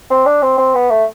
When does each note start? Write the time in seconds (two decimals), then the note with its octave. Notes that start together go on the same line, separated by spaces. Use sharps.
0.10 C4
0.26 D4
0.42 C4
0.58 C4
0.75 B3
0.90 A3